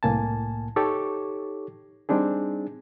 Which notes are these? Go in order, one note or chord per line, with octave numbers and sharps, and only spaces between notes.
C2 A2 A#3 G#5 A5
D#4 G4 A4 C#5 C#6 D6
G3 C4 D4 D#4 G#4